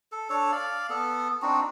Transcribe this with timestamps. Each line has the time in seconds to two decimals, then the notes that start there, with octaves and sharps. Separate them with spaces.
0.12 A4
0.30 D4 A4 C#5
0.52 D5 F5
0.90 B3 A4
1.42 C4 D4 D#4 F#4